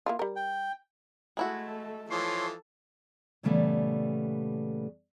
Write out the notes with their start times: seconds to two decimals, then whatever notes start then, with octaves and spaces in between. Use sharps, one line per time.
0.06 A#3 E4 F4
0.19 G3 A#4
0.36 G5
1.37 G#3 A3 E4 F#4 A4
2.10 E3 F3 A4 C#5 C6
3.43 A#2 C#3 E3 G3 A3 B3